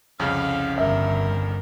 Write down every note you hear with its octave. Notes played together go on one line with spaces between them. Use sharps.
C2 F2 C#3 C#4 F5
G1 A#4 E5